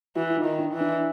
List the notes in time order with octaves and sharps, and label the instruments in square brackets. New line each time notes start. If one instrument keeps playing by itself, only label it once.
[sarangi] E3 [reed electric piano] E4 F#4
[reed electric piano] E4
D#4 F4
[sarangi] D#3
[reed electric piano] D4 E4
[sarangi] E3
[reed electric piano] D4 E4